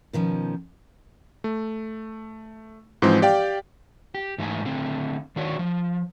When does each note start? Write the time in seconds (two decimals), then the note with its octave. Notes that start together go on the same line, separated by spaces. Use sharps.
0.13 B2 D#3 F3 C#4
1.44 A3
3.02 G#2 E3 F3 G#3 C4
3.22 G4 D5 F5 G5
4.15 G4
4.38 G#2 E3 A3 D#4 G#5
4.65 D3 A3 C4
5.36 D#3 D4 F#4 C#5
5.59 F3